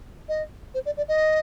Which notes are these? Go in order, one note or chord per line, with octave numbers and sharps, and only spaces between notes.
D#5
C5
D5
D5
D#5